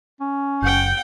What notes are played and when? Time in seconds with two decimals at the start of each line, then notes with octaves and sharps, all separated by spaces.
0.20 C#4
0.62 F#1 F#5 G5 G6